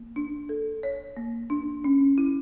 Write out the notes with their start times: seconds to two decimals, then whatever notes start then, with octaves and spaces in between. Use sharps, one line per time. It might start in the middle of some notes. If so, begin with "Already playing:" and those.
Already playing: A#3
0.16 D4
0.49 A4
0.83 C#5
1.17 A#3
1.50 D4
1.84 C#4
2.18 E4